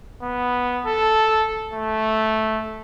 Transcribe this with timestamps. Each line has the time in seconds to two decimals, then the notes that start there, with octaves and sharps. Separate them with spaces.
0.22 B3
0.86 A4
1.73 A3